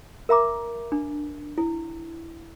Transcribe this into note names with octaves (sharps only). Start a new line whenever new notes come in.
A#4 E5 A#5 D6
D4
E4